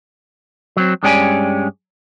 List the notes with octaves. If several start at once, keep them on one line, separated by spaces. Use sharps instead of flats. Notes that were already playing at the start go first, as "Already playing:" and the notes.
F#3 C4
G2 G#3 C#4 G4 D5 G#5